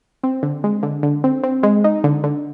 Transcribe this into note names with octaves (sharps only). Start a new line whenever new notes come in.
C4
D3
G#3
D3
D3
C4
C4
G#3
D#4
D3
D3